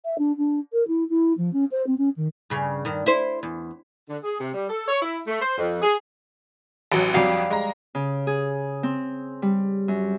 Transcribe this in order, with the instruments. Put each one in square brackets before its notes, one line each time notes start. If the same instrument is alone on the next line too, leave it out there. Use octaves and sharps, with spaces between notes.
[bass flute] E5
D4
D4
A#4
E4
E4
F3
C#4
C5
C4
C#4
D#3
[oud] G2 C#3
G2 D#3
E4 C5
E2
[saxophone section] D3
G#4
C3
G3
A4
C#5
E4
A3
C5
F2
G#4
[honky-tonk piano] A1 F#3
[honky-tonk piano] F2 F#3 [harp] G3 F5
[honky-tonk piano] G#3 A#5
[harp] C#3
G#4
C4
G3
F#2